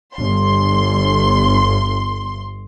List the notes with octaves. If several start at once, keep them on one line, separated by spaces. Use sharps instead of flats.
G1 C6